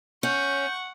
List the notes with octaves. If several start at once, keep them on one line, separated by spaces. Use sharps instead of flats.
C#4 F#5 C#6 G6